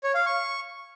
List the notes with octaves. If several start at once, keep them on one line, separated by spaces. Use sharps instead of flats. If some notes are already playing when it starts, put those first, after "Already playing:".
C#5
F5
C#6